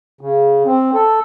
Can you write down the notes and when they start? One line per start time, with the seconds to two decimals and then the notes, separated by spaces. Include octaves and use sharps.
0.21 C#3
0.66 C4
0.94 A4